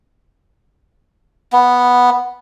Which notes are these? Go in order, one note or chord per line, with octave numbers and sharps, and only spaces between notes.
B3